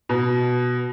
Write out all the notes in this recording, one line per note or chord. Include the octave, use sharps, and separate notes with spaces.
B2